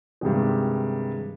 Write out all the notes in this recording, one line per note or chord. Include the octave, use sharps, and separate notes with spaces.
G2 C3 D#3 G#3